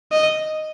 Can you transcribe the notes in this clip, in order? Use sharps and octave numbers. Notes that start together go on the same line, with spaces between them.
D#5